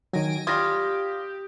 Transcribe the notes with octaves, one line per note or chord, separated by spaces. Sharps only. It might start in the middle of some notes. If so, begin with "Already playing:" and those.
D#3 F#3 G#5 A#6 D7
G3 F4 G4 D#6 G#6 A#6